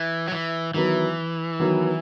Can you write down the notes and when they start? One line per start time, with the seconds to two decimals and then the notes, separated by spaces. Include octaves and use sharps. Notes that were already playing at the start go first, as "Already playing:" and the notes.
Already playing: E3
0.28 F#3
0.32 E3
0.74 D#3 E3 F#3 B3
1.60 D#3 F#3 B3